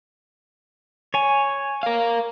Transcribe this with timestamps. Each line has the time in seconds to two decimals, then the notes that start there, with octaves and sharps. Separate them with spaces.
1.14 C#5 G#5
1.83 A#4 F5